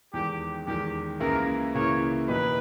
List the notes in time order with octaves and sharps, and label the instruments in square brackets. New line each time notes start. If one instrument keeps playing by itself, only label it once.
[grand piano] E2 D#3 G#3 [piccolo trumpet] G4
[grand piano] E2 D#3 G#3 [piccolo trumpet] G4
[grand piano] C#2 C#3 E3 A#3 E4 [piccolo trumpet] A#4
[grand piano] C#2 C#3 E3 A#3 E4 [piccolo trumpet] C#5
[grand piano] E2 B2 A#3 D#4 G4 [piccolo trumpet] B4